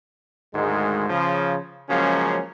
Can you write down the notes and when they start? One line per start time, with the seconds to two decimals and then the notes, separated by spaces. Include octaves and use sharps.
0.54 D2 G#2 D#3 G#3
1.09 C#3 F3
1.89 C#3 F3 F#3 G#3 A#3 C#4